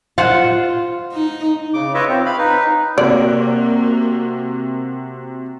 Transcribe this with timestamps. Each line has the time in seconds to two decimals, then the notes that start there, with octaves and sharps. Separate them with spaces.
0.18 F4 C5 F#5
1.12 D#4
1.74 C#3 D6
1.94 F4 B4 C#5 D#5 E5
2.08 C4
2.26 F5 B5
2.38 D#4 B4
2.98 C3 A#3 F#4 D5